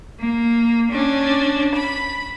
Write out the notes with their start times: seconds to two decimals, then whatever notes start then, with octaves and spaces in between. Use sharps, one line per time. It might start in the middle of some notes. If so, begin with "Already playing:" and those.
0.20 A#3
0.92 C#4 D4
1.75 B5